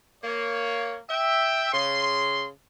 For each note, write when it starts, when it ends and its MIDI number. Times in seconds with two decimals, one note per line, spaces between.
0.24 0.97 58
0.24 0.97 73
1.10 1.71 76
1.10 1.71 79
1.73 2.46 49
1.73 2.46 84